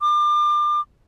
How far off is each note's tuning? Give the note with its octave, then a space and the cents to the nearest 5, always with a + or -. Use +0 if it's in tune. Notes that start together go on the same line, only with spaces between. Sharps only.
D6 +30